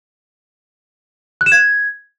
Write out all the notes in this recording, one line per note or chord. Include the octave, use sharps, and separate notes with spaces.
F#6
E7
G#6